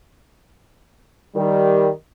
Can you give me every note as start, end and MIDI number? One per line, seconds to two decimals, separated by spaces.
1.35 1.89 51
1.35 1.89 55